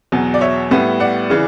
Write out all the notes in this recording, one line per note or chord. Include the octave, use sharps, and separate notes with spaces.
E2 B2 F#3
D5
C#5 E5
A2 G3 B3
D5 F#5
C#3 E3